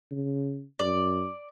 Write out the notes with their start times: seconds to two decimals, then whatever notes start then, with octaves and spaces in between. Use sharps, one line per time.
0.11 C#3
0.79 F#2 D5